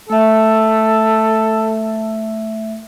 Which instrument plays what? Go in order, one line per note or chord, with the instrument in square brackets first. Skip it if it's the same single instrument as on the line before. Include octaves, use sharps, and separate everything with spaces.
[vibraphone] A3 E5 [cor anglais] A4